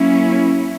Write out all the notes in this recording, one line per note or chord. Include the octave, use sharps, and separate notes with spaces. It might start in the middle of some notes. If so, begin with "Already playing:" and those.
Already playing: F#3 A#3 C#4 E4